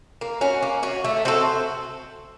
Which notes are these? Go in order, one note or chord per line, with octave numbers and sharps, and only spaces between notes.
A#3
C#4 F#4
A#3
C#4 F#4
A3
C4 F#4 A4